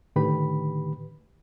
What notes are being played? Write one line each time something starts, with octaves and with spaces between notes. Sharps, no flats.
A2 D3 D#3 G4 B4 B5